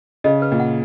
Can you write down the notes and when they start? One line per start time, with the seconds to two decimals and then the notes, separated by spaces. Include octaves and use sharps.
0.24 C#3 D#5
0.42 B4
0.52 A#2
0.60 F#5